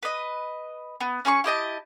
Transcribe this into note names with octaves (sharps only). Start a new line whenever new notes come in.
B4 D#5
B3
C#4 G#4 B5 C#6
E4 G4 D#5 A5